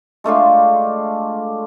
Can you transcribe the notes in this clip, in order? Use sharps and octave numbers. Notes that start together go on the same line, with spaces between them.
G#3 A3 D4 F4